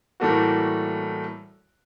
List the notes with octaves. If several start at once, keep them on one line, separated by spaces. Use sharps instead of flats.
A2 E3 G3 A3 A#3 F#4